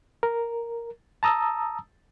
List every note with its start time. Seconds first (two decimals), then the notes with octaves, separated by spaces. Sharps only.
0.23 A#4
1.23 A5 A#5 D#6 E6